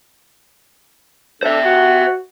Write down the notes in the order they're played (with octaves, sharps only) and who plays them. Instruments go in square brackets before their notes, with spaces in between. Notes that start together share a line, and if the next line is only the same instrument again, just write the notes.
[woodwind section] D4 A4 [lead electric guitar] C5 E5
[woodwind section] F#4 F#5